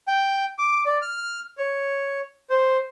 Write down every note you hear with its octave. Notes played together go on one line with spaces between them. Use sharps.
G5
D6
D5
F6
C#5
C5